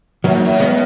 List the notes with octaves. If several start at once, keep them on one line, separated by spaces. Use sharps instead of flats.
F#2 F#3 A#3
G#2
F#2
G#3 B3